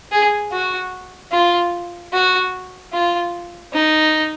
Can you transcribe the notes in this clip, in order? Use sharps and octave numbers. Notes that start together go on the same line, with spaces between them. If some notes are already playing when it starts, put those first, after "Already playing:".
G#4
F#4
F4
F#4
F4
D#4